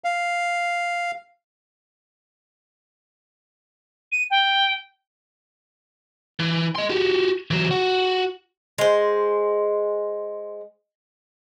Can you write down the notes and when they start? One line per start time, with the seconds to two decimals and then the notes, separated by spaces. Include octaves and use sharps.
0.04 F5
4.12 D#7
4.30 G5
6.39 E3
6.75 D#5 C6
6.90 F#4 G4
7.51 E3 F#3
7.71 F#4
8.78 G#3 C5